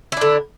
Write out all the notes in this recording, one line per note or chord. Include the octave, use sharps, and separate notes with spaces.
D3 D4 E4